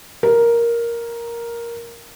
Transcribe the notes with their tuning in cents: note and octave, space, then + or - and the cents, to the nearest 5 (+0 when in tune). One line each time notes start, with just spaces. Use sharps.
A#4 +5